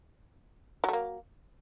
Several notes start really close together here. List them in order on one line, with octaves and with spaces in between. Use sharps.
F#3 A3 A#3